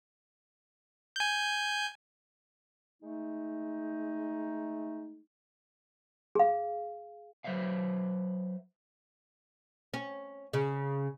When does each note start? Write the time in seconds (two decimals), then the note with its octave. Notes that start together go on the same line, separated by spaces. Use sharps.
1.16 G#5 G6
3.01 G#3 A3 D#4
6.35 G#4 F5
7.44 F#3 B4 C5 E5 F5
9.94 C#4
10.53 C#3